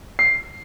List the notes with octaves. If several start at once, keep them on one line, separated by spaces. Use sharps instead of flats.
C7